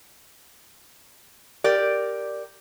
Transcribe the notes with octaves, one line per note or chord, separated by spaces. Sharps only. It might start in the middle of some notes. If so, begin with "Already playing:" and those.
G4 A#4 D5